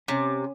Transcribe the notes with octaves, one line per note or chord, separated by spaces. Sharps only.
C3 C#4